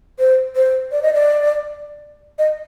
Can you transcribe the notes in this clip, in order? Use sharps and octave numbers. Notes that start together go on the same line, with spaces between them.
C5
C5
D5
D#5
D5
D#5